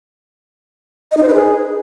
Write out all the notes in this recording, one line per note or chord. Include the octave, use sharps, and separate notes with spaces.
D#5
D#4
C5
B4
G#4